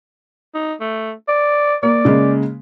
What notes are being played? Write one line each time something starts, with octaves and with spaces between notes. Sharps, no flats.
D#4
A3
D5
A#3 D5
C#3 G#3 A#3